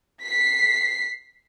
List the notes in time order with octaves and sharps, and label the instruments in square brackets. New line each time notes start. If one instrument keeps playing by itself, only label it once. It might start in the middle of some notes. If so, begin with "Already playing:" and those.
[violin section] B6 C7